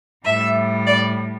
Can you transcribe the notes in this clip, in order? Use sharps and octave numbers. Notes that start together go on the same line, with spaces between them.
A2 G3 E5
D5